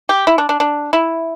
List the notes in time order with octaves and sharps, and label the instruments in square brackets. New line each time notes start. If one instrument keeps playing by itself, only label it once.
[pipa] G4
E4
D4
D4
D4
E4